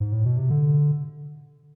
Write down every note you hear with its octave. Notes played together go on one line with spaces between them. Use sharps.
G#2
A2
B2
C3
D3